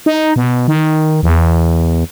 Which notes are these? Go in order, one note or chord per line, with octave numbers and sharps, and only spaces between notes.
D#4
B2
D#3
E2